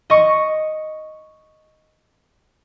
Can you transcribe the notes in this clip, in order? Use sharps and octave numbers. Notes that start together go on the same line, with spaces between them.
D#5 C#6